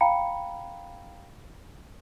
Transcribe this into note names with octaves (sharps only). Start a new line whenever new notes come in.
F5 G5 A#5 B5 C#7